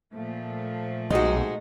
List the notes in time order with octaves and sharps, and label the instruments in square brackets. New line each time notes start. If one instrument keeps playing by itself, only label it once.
[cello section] A#2 F3 A3
[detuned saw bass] B1 [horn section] G#2 C3 G#3 [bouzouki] D#4 F#4